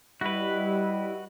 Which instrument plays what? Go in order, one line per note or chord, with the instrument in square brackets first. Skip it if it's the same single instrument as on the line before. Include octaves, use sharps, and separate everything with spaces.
[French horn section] G3 D#5 [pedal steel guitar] E4 [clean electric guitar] F#4 B4